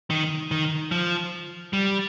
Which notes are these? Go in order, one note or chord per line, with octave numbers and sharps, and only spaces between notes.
D#3
D#3
F3
G3